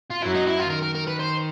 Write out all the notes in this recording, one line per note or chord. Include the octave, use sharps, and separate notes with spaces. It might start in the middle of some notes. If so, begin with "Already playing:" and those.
F4
F#2 F#3 E4
D#4
E4
F4
D#3 A#4
A#4
A#4
B4
C5